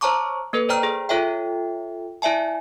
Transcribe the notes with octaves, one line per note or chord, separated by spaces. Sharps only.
C5 C#5 A5 A#5 C#6 D6
A#3 A4 B4
C5 D5 G5 A#5 F6
G#4
F4 A4 C#5 E5 G5
E4 D5 E5 G#5 A5